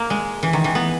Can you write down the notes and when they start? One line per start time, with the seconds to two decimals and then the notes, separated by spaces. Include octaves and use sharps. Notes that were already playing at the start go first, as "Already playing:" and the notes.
Already playing: A#3
0.10 G#3
0.43 E3
0.53 D#3
0.64 E3
0.75 B3